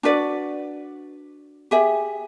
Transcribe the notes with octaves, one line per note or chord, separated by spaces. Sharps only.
D4 F#4 B4 D5
G4 G#4 E5